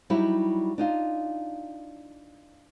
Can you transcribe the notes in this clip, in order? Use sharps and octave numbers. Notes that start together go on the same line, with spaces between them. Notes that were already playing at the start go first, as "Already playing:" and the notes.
F#3 G3 D#4 E4 G4
D4 D#4 F4